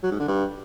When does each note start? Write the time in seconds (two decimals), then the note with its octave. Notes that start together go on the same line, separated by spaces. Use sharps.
0.03 F#3
0.11 G#2
0.20 D3
0.28 G2